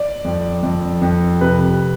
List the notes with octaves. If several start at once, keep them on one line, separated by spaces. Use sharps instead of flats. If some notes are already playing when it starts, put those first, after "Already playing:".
Already playing: D5
F2
F2
F2
C3 B4